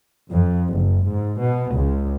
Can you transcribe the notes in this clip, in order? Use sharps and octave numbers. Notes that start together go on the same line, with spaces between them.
F2
F#1
G#2
B2
C#2